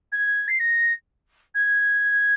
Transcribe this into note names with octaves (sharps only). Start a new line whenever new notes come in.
G#6
C7
A#6
G#6